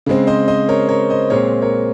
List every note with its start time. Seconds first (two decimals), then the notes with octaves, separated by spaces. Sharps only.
0.06 C#3 G#3 C4
0.27 C5 D#5
0.48 C5 D#5
0.69 A#4 C#5
0.89 A#4 C#5
1.10 C5 D#5
1.30 A#2 G#3 C4 A#4 C#5
1.62 A#4 C#5